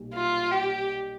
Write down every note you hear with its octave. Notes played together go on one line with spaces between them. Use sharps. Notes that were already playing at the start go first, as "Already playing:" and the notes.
Already playing: B1 A#2 G3
F4
G4